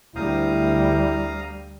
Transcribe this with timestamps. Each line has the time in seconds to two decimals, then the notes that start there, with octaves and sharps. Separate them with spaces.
0.16 D2 G3 E4 F5 A#5 D#6